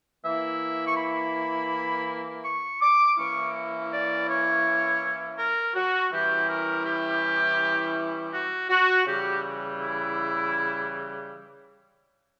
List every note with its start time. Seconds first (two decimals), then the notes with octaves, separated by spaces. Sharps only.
0.24 E3 A#3 E4 E5
0.86 C#6
0.97 B5
2.45 C#6
2.81 D6
3.18 E3 A#3 C#4 E4 C#6
3.92 D5
4.28 C#5
5.38 A#4
5.75 F#4
6.12 E3 G3 C#4 E4 G4
6.49 A#4
6.85 G4
8.33 F#4
8.69 F#4
9.06 C#3 E3 G3 G4
9.80 E4